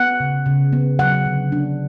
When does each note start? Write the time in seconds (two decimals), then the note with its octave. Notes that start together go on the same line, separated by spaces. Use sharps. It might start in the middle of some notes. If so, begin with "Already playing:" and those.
Already playing: B3 F#5
0.20 C#3
0.46 C#3
0.73 B3
0.99 F#3 F#5
1.26 D3
1.52 D4